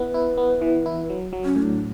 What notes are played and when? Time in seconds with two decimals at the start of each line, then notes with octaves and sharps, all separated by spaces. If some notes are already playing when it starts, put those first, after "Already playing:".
Already playing: B3 E4 B4
0.14 E4
0.38 B3
0.62 E3
0.86 E4
1.10 F#3
1.33 F#3
1.45 C#4
1.56 A2
1.63 D4